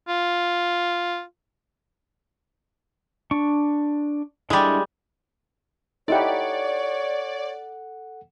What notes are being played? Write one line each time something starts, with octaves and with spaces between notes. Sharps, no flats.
F4
D4 C#6
G3 G#3 D4 E4 A4
D#4 E4 G4 A4 C#5 D5 F#5